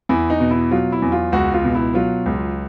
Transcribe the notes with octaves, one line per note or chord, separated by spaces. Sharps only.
E2 E4
D#4
B2
E4
F#3 F4
E4
E2
F4
C#2 F#4
F4
B2
E4
F#3 F4
C#2